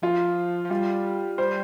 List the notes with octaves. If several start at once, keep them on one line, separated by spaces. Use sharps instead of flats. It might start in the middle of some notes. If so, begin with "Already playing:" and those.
F3 F4
F3
G3 F4
G3 C5